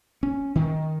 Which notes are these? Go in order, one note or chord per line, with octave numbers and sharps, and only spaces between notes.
C#4
D#3